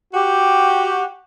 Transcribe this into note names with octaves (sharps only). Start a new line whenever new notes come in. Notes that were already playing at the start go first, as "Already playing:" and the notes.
F#4 G4